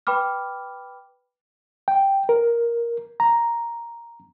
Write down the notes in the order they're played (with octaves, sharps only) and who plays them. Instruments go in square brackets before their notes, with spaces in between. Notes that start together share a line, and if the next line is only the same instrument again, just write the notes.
[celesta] B4 G5 B5 D6 F6
[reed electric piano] G5
A#4
A#5